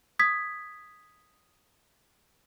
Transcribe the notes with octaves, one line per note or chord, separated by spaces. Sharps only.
D#6 G#6 B6